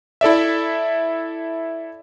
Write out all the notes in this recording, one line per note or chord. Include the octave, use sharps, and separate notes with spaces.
E4 A4 D5 E5